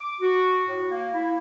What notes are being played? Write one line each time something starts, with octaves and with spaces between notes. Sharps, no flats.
D6
F#4
A2
A#3
E4